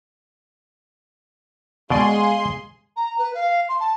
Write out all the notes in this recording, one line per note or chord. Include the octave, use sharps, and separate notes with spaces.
B2 G#3 G#4 D5 F5 C6
A#5
B4
F5
C6
A5